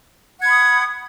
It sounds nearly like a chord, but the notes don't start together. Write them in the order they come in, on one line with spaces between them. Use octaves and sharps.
F#5 G#6 B5 D#6